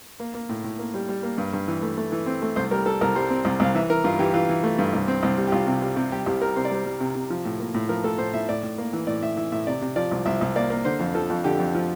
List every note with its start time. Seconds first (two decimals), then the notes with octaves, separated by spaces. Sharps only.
0.20 A#3
0.34 A#3
0.49 A2
0.64 A2
0.79 A#3
0.94 G3
1.09 G3
1.23 A#3
1.38 G2
1.53 G2
1.68 E3
1.82 A3
1.97 A3
2.12 E3
2.26 C4
2.42 A3
2.56 C2 C5
2.71 G3 A#4
2.86 G3 A4
3.01 C2 A#4
3.15 G3 C5
3.30 C4
3.45 C2
3.60 C2 F5
3.75 E3 E5
3.90 E3 A#4
4.04 G2 F4
4.19 E3 G4
4.34 E3 F4
4.49 E3
4.63 A3
4.78 G2
4.93 C2
5.08 C4
5.23 C2
5.37 G3
5.47 G4
5.52 C2 F4
5.67 C3
5.82 G3
5.96 C3
6.12 G3 G4
6.26 C2 G4
6.41 G3 A#4
6.56 C3 C5
6.65 D5
6.71 G3 C5
6.85 G3
7.00 C3
7.15 C3
7.30 F3
7.45 A2
7.60 A#3
7.74 A2
7.89 F3 A#4
8.04 A2 A4
8.18 A2 C5
8.33 A2 E5
8.49 A2 D5
8.63 A2
8.78 A#3
8.93 E3
9.07 A2 D5
9.22 A2 E5
9.37 E3 E5
9.52 A2 E5
9.67 C3 D5
9.81 C3
9.96 F3 D5
10.11 C2
10.26 C2 E5
10.41 C2
10.56 A#3 D5
10.70 A#3
10.85 D3 C5
10.99 F2
11.14 F3 A4
11.30 F2
11.44 D3 G4
11.59 F2
11.74 F3